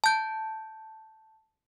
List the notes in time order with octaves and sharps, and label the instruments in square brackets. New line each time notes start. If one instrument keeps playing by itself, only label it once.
[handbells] A5 G6